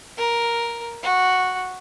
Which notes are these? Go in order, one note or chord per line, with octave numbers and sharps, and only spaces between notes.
A#4
F#4